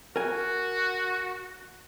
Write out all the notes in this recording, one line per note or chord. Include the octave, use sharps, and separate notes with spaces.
F#4 A#4 G#5